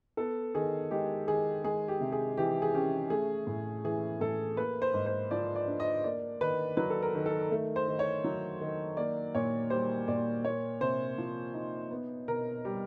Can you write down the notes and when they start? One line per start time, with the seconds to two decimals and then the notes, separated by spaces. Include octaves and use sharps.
0.17 B3 A4
0.55 D#3 G#4
0.91 G#3 G4
1.28 D#3 G#4
1.64 G#3 G#4
1.88 G4
2.00 C3
2.12 G#4
2.37 E3 G4
2.62 G#4
2.74 C#4 G4
3.10 A3 G#4
3.47 A2
3.85 E3 G#4
4.21 A2 A4
4.57 A#3 B4
4.82 C5
4.94 G#2
5.06 C5
5.31 F3 D5
5.56 D5
5.67 D4
5.80 D#5
6.04 A#3 D5
6.41 D#3 B4
6.77 F#3 B4
6.90 A4
7.03 A#4
7.15 D#3
7.26 A4
7.51 A3
7.76 C5
7.88 D#3
7.99 C#5
8.24 F#3
8.61 D#3
8.97 A#3 D5
9.35 A#2 C#5
9.70 G3 C5
10.08 A#2 D5
10.45 A#3 C#5
10.81 C3 C5
11.18 F3
11.54 D#4
11.91 B3
12.28 B2 A#4
12.65 G3